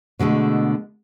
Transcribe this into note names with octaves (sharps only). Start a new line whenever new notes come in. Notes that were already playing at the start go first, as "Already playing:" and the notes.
B2 D3 G#3 A3